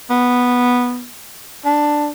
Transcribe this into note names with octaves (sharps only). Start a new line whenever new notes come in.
B3
D4